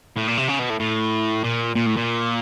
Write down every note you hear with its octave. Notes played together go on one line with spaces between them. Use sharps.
A2
A#2
C3
C#3
B2
A2
A2
A#2
A#2
A2
A#2